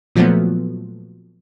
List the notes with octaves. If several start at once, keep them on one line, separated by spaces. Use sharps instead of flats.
A#2 F3 F#3 A3 B3